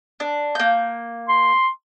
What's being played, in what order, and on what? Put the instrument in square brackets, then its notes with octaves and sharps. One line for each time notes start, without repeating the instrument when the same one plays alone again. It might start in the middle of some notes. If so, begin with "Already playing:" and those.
[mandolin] D4
A#3 G6
[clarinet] C6